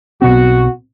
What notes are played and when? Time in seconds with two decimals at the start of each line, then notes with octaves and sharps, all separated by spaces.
0.22 B1 B2 C4 F#4